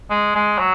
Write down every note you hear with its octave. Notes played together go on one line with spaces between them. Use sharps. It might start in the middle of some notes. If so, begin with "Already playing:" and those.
G#3
G#3
F#3